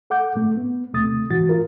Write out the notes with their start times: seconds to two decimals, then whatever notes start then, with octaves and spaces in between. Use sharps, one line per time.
0.10 A4 F#5 D6 G6
0.35 G#2 A3
0.57 B3
0.93 D#2 C3 A3 D#6 A6
1.30 G#2 E3 F#4 A6
1.49 F4 A#4